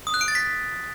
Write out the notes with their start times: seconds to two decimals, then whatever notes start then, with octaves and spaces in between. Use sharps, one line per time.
0.07 D#6
0.14 F#6
0.21 D7
0.28 A6
0.35 B6